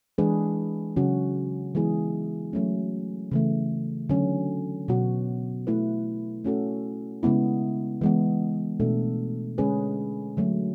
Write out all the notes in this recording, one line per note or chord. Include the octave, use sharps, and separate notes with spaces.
E3 G#3 D4 G#4 B4
C#3 F#3 C#4 F#4
E3 G#3 B3 E4 G#4
F#3 A3 C#4
C#3 E3 A3
D3 F#3 C#4
B2 F#3 B3 F#4
A3 E4 B4
A3 C#4 F#4 A4
C#3 G#3 B3 E4
E3 G#3 B3
B2 A3 D4 A4
D3 G#3 C#4 G#4 B4
D3 F#3 A3